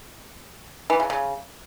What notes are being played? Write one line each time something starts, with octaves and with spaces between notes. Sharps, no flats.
E3
C#3
C#3